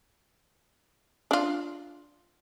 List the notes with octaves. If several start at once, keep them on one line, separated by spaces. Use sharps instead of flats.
D4 F4